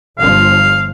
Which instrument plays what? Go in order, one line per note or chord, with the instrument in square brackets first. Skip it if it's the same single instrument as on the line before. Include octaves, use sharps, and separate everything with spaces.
[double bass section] G1 F3 [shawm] F5